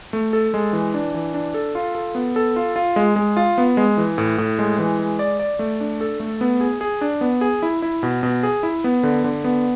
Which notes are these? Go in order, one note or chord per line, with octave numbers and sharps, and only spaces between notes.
A3
A4
G#3
E3
D4
E3
D4
A4
F4
A4
B3
A4
F4
F4
G#3
G#3
F4
B3
G#3
E3
A2
A2
G#3
E3
G#3
D5
D5
A3
D4
A4
A3
B3
G#4
G#4
D4
B3
G#4
E4
E4
B2
B2
G#4
E4
B3
D3
D3
B3